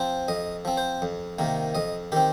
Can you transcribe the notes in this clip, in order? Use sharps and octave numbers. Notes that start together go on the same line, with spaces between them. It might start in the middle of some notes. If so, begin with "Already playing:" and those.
Already playing: F3 C4 C5
F2 D#5
F3 C4
C5
F2
C3 D#3 A#3
F2 D#5
D#3 C4 G4